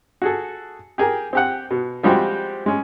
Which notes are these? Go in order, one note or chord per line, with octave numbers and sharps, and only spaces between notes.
F#4 G#4 A4
G4 G#4 A#4
C4 G4 F#5
B2
F3 G3 G#3 C4 F#4 G4
G#3 C#4